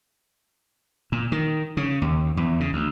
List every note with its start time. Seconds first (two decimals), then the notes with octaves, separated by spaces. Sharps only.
1.12 A#2
1.32 D#3
1.77 C#3
2.02 D#2
2.37 E2
2.60 C#3
2.73 D2